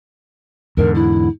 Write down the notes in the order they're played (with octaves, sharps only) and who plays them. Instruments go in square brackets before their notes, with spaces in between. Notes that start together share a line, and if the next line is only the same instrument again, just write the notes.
[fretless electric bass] E2 G#2 D3 [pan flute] A#4
[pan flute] E4